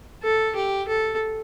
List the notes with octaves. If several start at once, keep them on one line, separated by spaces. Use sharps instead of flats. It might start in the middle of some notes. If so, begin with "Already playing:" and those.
A4
G4
A4